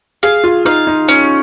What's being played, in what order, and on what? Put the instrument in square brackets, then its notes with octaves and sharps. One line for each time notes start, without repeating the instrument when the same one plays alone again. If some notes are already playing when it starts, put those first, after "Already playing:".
[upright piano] G#4 [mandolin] F5
[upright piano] F4
[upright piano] D#4 [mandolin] F5
[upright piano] D#4
[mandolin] C#4